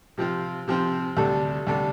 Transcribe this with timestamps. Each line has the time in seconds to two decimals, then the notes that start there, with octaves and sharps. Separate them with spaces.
0.18 C3 F3 C4 F4
0.68 C3 F3 C4 F4
1.17 D2 C3 G3 D4 A4
1.67 D2 C3 G3 D4 A4